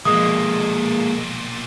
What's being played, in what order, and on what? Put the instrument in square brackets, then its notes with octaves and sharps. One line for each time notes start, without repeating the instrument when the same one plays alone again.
[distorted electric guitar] B1 A#2 [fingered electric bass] F3 [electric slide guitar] G#3 A#3 [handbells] D#6